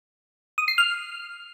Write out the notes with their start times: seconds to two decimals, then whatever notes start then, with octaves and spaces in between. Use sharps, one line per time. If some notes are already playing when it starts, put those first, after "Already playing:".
0.58 D#6
0.68 C7
0.78 F6